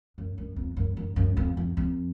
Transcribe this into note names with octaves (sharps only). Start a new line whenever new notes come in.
F#2
F#2
F2
F#2
F#2
F#2
F2
F2
F2